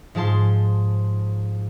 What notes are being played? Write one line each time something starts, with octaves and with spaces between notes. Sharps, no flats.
G#2 F3 G#4 A5 C6